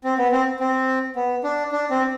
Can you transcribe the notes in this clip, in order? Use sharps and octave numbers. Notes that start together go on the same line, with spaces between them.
C4
B3
C4
C4
B3
D4
D4
C4